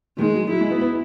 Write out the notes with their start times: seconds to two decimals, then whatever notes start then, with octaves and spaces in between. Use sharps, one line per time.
0.18 D#3 G#3
0.34 F#3
0.50 F#3 E4
0.61 G#3
0.71 B3
0.81 B3